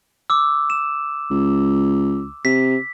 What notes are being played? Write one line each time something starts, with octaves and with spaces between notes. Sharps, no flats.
D6 E6
E7
C#2
C3 B6